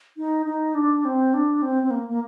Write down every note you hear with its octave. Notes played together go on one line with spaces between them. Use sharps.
D#4
D#4
D4
C4
D4
C4
C4
A#3
A#3